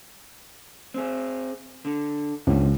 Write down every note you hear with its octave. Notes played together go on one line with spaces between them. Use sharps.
C4 G#4
D3
C#2 G#2 B2 D3